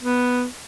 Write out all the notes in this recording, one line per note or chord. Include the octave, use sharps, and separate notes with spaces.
B3